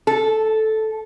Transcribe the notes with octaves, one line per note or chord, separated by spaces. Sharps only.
A4